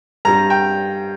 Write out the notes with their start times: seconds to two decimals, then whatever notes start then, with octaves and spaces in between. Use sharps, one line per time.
0.25 G2 G3 A#5
0.50 G5